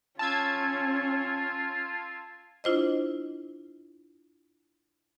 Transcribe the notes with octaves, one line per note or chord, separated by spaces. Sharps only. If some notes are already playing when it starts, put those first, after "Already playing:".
C#4 F4 A5 E6 G#6
D4 E4 F4 C5 D#5